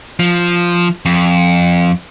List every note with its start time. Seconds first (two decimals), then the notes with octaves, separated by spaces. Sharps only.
0.19 F3
1.06 F2